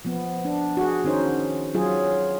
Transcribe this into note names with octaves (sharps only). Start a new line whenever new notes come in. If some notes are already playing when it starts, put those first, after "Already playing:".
F3 B3
D4
F#4 G#4
D#3 C#4 D#4 C5
F#3 F4 G#4